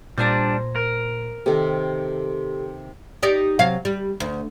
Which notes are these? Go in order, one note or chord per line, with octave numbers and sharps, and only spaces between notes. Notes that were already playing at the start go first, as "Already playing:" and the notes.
A#2 G3 D4 C5 G#5 A#5
A#4
C3 D#3 G4 A4
D#4 G4 D5
C3 F#3 F5
G3
D2